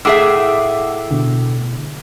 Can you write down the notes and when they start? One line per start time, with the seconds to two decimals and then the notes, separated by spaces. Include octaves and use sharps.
0.05 A2 G#4 E5 F#5 D6 E6
1.11 B2 D3